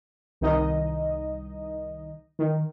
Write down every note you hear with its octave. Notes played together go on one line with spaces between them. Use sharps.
C2 D#3 D#4 D#5
D#3